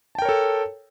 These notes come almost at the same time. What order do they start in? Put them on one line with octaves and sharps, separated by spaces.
A5 G5 A#4 C#5 A4